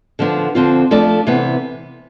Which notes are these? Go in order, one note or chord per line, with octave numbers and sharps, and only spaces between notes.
D3 F3 B3 D4
D3 F3 C4 F4
F3 A3 D4 A4 D5
C3 E3 B3